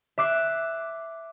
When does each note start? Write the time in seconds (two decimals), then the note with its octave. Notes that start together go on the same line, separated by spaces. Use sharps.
0.18 E5 D6 F#6 C7